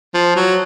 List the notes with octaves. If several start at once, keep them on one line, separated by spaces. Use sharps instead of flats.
F3
F#3